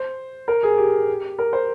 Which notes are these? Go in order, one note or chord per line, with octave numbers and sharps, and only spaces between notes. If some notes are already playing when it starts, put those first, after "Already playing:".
Already playing: C5
A#4
G#4
G4
A#4
C5